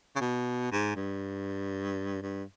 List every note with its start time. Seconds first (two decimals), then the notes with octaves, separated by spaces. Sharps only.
0.16 C#3
0.21 B2
0.72 G#2
0.96 G2
2.23 G2